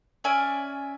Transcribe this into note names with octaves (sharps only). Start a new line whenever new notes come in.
C#4 D5 E5 G#5